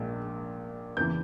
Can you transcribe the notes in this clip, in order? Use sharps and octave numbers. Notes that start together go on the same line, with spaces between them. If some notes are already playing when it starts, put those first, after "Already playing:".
Already playing: A#1 A#2 G#3
E2 C#3 E3 G6